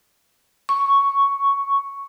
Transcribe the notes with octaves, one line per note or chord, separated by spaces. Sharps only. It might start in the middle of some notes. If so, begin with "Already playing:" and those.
C#6